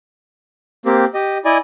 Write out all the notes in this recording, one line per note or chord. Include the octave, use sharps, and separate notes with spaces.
A#3 C4 G4
G4 D#5
E4 D5 D#5 G#5